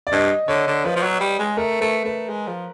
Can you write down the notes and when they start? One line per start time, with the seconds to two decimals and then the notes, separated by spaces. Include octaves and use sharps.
0.07 D5
0.12 G2 D#5
0.48 D3 C#5
0.67 D3
0.84 F3 B4
0.96 F3
1.03 F#3
1.20 G3
1.39 G#3
1.57 A3 A#4
1.81 A3 B4
2.05 A3 B4
2.29 G#3
2.47 F3